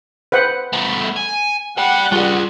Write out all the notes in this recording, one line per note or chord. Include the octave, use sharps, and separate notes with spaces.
B4 C5 F#5
A3 B3
G#5
D5 F#5 G5
G3 F4 G#4